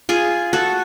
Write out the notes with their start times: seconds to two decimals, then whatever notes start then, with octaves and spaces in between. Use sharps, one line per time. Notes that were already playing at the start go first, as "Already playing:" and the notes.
0.09 F4 G#4
0.53 F#4 A4